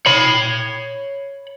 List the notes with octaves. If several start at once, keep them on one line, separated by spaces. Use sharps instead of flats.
C#5 B5